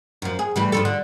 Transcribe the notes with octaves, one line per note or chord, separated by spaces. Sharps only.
F#2 F3
G#4
A2 E3 G3
G2 F3 A4
D3